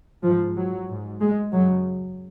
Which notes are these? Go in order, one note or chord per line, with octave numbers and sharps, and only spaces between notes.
G#2 F3
F#3
G#2
G#3
F#2 C#3 F#3